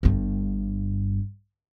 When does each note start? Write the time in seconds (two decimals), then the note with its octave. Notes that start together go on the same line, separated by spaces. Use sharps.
0.03 G1 G2